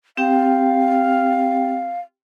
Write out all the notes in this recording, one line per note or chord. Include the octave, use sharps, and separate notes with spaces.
C4 G4 F5 G5